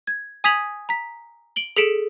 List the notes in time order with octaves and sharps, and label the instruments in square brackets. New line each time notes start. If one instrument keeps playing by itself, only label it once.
[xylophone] G#6
G#5 D#6 G#6 B6 F7 F#7
A#5 B6
D7 F#7 G7
G#4 A4 B6 C#7 D7 E7